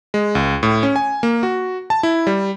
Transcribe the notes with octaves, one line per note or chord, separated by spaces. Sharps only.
G#3
C#2
A2
C#4
G#5
A#3
F#4
A5
E4
G3